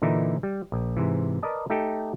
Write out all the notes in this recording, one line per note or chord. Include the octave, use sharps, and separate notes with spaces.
A#2 D3 E3 D#4 E4
G3
A#1
G#2 C3 E3
A#4 B4 D5 D#5 A5
A3 D#4 G4 A4 G5